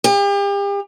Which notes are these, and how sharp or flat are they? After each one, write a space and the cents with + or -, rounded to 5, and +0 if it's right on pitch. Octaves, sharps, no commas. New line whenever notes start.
G4 +40